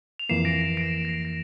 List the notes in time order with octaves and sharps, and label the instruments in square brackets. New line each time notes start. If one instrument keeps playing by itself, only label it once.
[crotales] F7
[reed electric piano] F2 E3 A#3 [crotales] C7 E7
[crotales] A#6 D7
C7
A#6 D7
A#6
C7
A#6